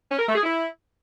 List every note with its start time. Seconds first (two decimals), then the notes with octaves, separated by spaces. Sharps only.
0.11 C#4
0.19 A#4
0.27 A3
0.35 G#4
0.44 E4